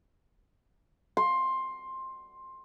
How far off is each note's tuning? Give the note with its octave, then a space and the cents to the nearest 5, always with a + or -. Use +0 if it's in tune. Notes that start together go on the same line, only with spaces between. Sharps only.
C6 +15